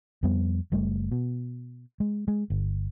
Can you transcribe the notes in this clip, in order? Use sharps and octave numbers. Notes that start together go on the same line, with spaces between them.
F2 G3 B3
F#1 G3 A3
B2
G#3
G#3
G1